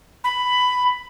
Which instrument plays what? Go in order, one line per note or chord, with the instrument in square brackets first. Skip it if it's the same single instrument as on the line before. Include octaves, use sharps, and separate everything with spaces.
[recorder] B5